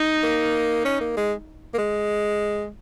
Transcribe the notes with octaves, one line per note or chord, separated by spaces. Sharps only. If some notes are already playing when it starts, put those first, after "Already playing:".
Already playing: D#4
A#3
C#4
A#3
G#3
A#3
G#3